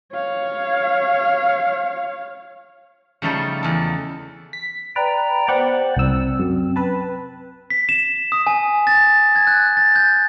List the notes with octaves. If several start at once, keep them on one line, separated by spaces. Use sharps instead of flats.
C#5 F5
C#3 F3 G3 A3 D#4 A4
E2 A4
B6
B4 D5 G5 A#5
B3 G4 C5 D5 F#5
C2 C4 E6
F#2
B4 A5
B6
E7
D#6
G#5
A6
G#6
F#6
A6
G6